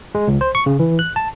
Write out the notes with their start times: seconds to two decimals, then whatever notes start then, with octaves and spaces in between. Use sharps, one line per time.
0.15 G#3
0.28 C#2
0.41 C5
0.55 C#6
0.66 C#3
0.79 E3
0.99 F#6
1.16 A5